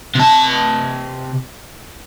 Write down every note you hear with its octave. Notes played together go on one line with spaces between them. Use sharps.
C3 A5